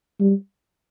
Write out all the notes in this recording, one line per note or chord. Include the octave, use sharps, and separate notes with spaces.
G3